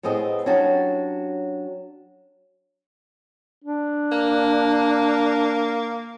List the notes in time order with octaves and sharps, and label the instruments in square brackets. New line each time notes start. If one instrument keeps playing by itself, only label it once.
[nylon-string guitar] A2 B3 C4 G#4 D#5
F#3 G3 C#4 D4 F#4
[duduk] D4
[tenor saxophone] A#3